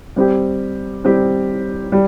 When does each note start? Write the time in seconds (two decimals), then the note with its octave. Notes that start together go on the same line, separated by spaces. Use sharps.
0.16 G3 C4 G4
1.04 G3 C4 G4
1.92 G3